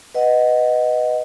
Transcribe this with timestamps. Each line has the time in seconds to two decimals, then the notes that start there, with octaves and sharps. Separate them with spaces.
0.15 B4 D#5 F#5